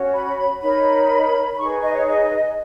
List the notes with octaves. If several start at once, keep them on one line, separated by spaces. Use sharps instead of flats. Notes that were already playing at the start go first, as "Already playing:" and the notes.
Already playing: C#4 F#4 C#5
B5
B5
B5
D#4 A#4 C#5 B5
B5
D#4 G#4 B4 C#6
D#5
C#5
D#5